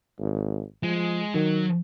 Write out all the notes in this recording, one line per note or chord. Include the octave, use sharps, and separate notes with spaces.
G#1
F3 G#3
D#3 F#3